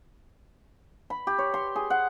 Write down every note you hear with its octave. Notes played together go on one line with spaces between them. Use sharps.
B5
G4
C#5
C6
G#4
F#5